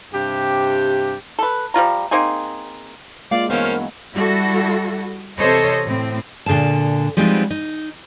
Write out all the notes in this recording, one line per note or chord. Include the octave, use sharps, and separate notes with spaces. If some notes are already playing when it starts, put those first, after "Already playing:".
G2 C3 G4
A4 B4
F3 G3 F4 A#5
A#3 C4 D#4 G#4
G#3 A#3 F4 D5 F5
G2 E3 F#3 B3 C#4 A#4 C5 F5
G3 E4 F#4 A4
C3 E3 A4 C5 C#5 D#5
A2 C4
A#2 D3 G#4 F5 A5
F3 G3 G#3 B3 C4 D#4
D#4